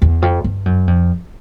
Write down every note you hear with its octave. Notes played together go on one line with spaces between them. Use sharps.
E2
F2
G2
F#2
F2